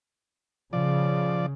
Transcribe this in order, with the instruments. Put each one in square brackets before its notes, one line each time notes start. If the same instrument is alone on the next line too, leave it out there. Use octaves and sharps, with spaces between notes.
[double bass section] C#3 [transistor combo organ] F3 D5